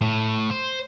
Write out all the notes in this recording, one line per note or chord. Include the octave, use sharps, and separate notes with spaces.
A2
C5